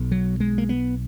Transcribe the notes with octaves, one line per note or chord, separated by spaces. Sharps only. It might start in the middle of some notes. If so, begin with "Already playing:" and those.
Already playing: B1 B2
F#3
G#3
A#3
B3